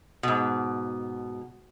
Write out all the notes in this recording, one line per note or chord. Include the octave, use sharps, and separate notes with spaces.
G#2 B2